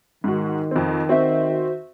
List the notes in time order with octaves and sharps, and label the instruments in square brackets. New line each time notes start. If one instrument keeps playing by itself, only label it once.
[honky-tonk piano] G#2 F#4 [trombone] D#3
[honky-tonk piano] F2 C4
[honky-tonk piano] C4 [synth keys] F#4 C5 E5